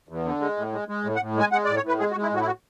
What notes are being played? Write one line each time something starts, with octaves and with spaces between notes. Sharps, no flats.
E2
D3
G#3
A2
G#3
G#3
A2
F#5
A2
G#3 G#5
G#3 F#5
A2 D5
C#5
A2
B4
G#3 G#4
F#4
G#3
E4
A2 F#4
E4
F#4